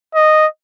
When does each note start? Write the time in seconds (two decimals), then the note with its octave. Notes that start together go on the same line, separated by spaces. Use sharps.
0.15 D#5